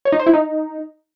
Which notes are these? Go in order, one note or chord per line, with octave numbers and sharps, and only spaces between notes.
C#5
D#4
C5
E4
D#4